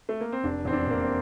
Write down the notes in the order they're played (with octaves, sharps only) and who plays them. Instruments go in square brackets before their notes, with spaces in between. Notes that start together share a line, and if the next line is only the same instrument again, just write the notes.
[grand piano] A3
A#3
C4
F1 D4
E2 C4
D4
E2 A#3
C4